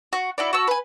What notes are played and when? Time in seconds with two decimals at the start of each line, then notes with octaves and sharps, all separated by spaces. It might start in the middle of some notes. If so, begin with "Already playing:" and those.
0.13 F#4
0.38 E4 F#4 D5
0.53 F#4 A5 E6
0.68 B4 G#5